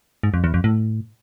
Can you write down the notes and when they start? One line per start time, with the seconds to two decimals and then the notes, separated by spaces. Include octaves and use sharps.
0.23 G#2
0.34 F2
0.44 E2
0.54 F2
0.64 A2